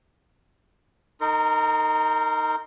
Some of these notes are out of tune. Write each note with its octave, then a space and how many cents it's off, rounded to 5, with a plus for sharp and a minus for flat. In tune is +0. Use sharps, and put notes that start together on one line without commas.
D#4 +0 A#4 -30 C6 +0